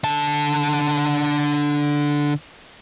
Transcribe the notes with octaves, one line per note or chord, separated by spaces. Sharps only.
D3 A5